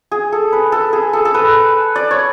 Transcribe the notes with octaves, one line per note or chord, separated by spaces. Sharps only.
G#4
A4
B4
A4
G#4
A4
A4
B4
D5
C#5